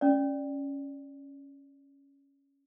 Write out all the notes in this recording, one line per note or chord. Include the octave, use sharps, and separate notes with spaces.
C#4 D5